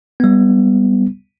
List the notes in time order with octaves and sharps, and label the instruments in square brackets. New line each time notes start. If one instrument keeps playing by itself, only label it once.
[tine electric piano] G3 B3